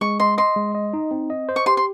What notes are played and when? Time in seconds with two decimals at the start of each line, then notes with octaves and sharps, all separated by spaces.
0.01 G#3 C#6
0.20 D#5 C6
0.38 D#5 C6
0.56 G#3
0.75 D#5
0.93 D#4
1.11 C4
1.30 D#5
1.49 C5
1.56 C#6
1.66 G4 C6
1.77 C6